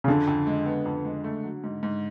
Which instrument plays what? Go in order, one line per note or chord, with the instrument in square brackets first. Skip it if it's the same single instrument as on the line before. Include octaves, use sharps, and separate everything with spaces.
[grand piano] C#3
[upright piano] F2 [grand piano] D3
[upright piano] F2
G#3
B3
F2
G#3
A3
F#3
G#2
G#2